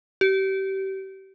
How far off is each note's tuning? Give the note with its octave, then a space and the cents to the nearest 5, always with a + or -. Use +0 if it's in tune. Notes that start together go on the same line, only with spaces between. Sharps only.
G4 -30